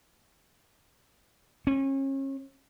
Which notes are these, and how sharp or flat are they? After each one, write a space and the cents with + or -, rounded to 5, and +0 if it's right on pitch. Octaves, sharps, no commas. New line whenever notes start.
C#4 -35